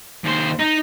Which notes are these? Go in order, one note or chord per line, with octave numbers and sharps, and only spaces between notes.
D#2 C5
D#4